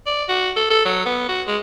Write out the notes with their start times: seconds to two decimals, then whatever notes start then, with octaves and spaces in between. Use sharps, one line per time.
0.06 D5
0.29 F#4
0.56 A4
0.70 A4
0.85 F#3
1.06 B3
1.29 F#4
1.47 G#3